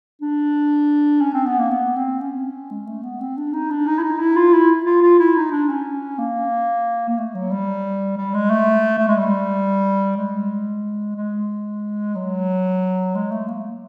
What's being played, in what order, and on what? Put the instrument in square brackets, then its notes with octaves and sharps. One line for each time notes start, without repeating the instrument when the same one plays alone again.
[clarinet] D4
C#4
C4
B3
A#3
B3
C4
C#4
G#3
A3
B3
C4
D4
D#4
D4
D#4
E4
D#4
E4
F4
E4
F4
F4
E4
D#4
D4
C#4
A#3
A#3
A3
F#3
G3
G3
G#3
A3
A3
G#3
G3
G#3
G#3
F#3
G#3
A3
A#3